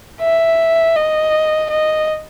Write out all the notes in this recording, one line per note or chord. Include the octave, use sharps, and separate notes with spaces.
E5
D#5
D#5